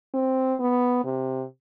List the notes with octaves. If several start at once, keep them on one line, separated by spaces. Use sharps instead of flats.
C4
B3
C3